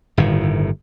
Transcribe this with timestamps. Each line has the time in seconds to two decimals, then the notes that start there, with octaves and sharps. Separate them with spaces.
0.17 G1 A2 D#3